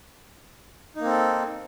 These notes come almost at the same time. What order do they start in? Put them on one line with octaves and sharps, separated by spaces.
D#4 A#3 C4 A4